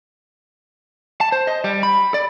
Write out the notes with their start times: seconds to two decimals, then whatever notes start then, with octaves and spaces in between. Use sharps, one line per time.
1.21 A5
1.32 C5
1.47 D#5
1.64 G3
1.83 B5
2.14 D5